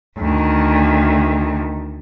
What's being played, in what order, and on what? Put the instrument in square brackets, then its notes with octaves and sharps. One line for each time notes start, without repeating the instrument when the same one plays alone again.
[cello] D2 D#3